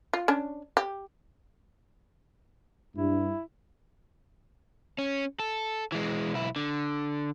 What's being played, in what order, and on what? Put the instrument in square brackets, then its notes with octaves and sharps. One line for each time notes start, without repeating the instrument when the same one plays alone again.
[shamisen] F4
C#4 D4
G4
[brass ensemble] G2 [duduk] E4
[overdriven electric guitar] C#4
A4
E3 G#3
B1 E4
D3